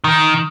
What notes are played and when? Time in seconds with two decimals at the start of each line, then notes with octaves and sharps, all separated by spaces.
0.04 D#3